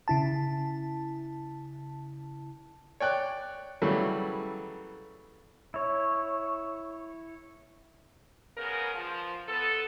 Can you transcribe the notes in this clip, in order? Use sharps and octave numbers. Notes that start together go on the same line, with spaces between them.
C#3 E4 A5
C#5 D5 G5 F#6
C#3 E3 F#3 G3 A3
E4 C#5
C#3 B3 G#4 A#4
F3
B3 A4